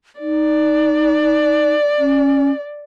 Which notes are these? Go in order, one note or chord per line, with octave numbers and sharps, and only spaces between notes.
D#4 D5
C#4